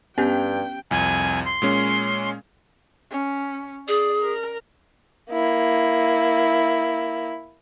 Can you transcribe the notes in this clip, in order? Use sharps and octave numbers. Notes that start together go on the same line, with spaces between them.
G2 B3 C#4 G4 G5 G6
C2 F2 G#5
C6
A#2 G#3 C#4
C#4
G#4 D5
A#4
A#3 E4